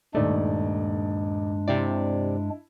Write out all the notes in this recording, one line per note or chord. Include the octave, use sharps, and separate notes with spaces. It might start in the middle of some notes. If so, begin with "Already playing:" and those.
D#1 G2 G#3 A3 D4 D#4 D5
C3 C4 E4 D5